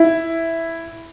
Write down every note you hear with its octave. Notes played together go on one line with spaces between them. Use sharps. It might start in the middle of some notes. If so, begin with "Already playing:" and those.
Already playing: E4